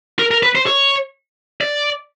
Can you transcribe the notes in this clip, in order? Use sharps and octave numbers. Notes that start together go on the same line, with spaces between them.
A#4
A#4
B4
C5
C#5
D5